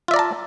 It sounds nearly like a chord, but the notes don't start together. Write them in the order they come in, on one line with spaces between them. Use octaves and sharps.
F4 E5 D5 A#5 A5